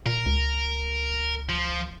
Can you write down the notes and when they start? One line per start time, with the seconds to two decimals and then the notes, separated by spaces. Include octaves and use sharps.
0.06 A#2 A#4
0.26 C#2
1.49 F3